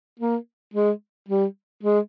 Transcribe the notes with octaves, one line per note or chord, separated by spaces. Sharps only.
A#3
G#3
G3
G#3